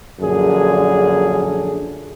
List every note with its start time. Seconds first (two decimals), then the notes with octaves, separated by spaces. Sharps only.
0.20 A#1 F#2 D3 G#4